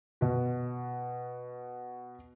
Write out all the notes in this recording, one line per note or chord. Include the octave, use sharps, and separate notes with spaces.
B2 F#4